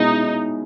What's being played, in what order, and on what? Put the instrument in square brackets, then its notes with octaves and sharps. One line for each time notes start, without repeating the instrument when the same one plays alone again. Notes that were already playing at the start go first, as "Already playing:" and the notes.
Already playing: [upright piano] B2 G#3 C#4 E4 G#4 [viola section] D#4